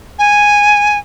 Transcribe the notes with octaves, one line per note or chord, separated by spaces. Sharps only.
G#5